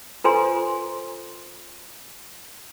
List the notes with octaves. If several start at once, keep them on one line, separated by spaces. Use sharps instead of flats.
F4 A4 B4 C5 G#5 C6